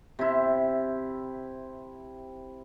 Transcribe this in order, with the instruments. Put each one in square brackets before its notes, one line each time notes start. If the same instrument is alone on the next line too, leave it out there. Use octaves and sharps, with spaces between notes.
[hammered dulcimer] C3 E4